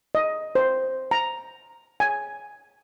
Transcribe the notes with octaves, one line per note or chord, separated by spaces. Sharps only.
D#5
C5
A#5
G#5